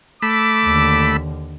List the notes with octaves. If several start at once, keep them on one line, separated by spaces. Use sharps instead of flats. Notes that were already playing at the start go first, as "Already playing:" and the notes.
A3 B5 D6 E6
D#2 D3